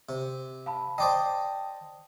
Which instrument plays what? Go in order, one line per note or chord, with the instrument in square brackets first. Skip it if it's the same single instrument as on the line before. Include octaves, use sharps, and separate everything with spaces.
[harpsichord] C3
[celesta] F5 A5 B5
[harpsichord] C5 D5 D#5 [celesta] G5 A5 D#6